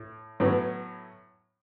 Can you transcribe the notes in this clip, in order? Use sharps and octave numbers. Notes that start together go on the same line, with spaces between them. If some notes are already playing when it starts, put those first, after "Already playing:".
Already playing: A2
A2 F#3 B3